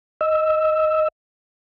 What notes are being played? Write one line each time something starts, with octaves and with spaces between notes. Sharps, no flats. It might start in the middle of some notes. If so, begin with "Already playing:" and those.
D#5 E6